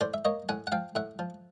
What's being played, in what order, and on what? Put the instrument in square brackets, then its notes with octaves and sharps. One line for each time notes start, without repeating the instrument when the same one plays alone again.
[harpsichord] A2 C5 D5
E5
A#3 C#5 D#5
A2 F#5 G#5
F#5
F3 F5 G5
A2 E5 F#5
F3